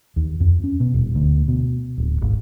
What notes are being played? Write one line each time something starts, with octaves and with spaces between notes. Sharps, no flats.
D#2
F2
C#4
B2
D#1
D2
B2
D1
G#1